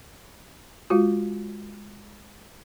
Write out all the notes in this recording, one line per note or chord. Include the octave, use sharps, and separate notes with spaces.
G#3 F4 F#4